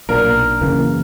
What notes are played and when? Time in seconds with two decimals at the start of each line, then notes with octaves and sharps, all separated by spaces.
0.09 B1 A#2 A#3 D4 A#4
0.61 F#2 C#3 E3 A#3